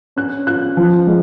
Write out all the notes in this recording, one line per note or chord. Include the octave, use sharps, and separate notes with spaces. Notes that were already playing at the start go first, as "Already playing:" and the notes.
C#4 F#6
F4 F#6
F3
G#3